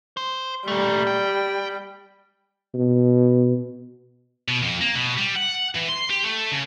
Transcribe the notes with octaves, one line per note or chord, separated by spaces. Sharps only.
C5
A#2 G3 A3
G5
B2
B2
F2
A#3
B2
G3
F#5
E3
C6
G4
A3
C#3